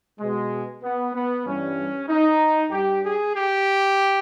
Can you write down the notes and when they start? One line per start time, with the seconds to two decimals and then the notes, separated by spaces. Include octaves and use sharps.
0.19 B2 G#3
0.82 B3
1.14 B3
1.45 G2 E3 G3 C#4
2.08 D#4
2.71 G2 G3 G4
3.02 G#4
3.34 G4